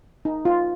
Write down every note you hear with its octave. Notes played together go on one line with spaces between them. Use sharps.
D#4
F4